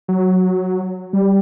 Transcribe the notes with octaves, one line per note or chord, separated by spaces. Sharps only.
F#3
G3